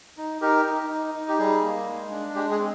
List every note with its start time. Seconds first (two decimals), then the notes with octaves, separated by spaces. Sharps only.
0.17 D#4
0.41 D#4 G4 A#4
0.66 D#4
0.90 D#4
1.15 D#4
1.28 G4
1.39 G3 G#4
1.62 A#3
1.87 G#3
2.11 D4
2.35 G#3 G4
2.51 G#4
2.59 C4